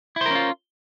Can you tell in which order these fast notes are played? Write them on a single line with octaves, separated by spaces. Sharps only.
E4 C5 A#4 C#4 F4